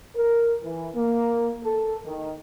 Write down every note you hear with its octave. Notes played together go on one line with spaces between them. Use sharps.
A#4
E3
A#3
A4
D#3